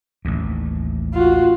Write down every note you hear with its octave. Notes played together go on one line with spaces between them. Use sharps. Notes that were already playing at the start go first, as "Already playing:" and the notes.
A1 D#2
F4 F#4